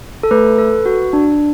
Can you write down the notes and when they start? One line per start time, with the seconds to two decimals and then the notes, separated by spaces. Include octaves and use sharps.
0.23 A4
0.31 A3 B4
0.58 A4
0.86 F#4
1.13 D4